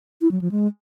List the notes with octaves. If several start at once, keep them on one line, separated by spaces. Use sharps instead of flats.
E4
F#3
F3
G#3